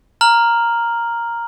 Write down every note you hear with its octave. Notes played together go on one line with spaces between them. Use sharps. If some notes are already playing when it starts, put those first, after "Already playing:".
A#5 F6 F#7